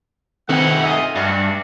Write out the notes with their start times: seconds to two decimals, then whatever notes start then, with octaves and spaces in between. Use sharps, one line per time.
0.49 D#3 A3 C4 D#4 E4 F#5
0.84 F4 D#5 E5 G#5
1.16 G2 D4 F#4